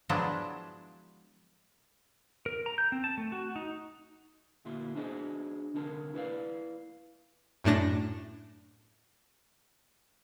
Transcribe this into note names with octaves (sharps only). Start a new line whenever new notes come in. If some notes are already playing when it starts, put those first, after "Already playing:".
F3 F#3 G#3 B3 D4 E4
A#4
A#5
G6
C4
A5
A3
F#4
D#4
D2 A#2 E4 F#4 C6
D4 D#4 F#4 G#4 C5 D#5
C2 D3 D#4 A#4 A5
E4 B4 D5 F5
F#2 A2 A3 D4 A#6